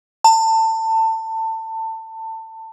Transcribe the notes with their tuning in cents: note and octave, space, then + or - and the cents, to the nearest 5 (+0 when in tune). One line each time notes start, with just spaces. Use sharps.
A5 +25